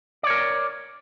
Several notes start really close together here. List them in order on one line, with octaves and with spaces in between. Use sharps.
D5 C#5 A#4